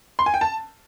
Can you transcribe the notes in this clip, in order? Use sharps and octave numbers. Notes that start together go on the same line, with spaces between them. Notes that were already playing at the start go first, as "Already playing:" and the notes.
C6
G#5
G5
A5